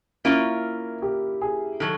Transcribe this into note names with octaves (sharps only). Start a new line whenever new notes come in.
A#3 C#4 E4 F4 A#4
G4
G#4
D#3 F#3 A4